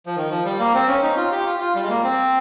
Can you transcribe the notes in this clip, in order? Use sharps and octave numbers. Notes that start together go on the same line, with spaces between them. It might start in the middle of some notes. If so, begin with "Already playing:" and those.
F3
D#3
F3
G3
A#3
C4
C#4
D#4
F4
G4
F4
F4
G3
G#3
A#3
C4